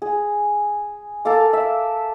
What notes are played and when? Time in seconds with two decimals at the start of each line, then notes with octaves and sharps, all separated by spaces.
0.02 G#4
1.25 A4 A#4 F5 D6
1.53 E5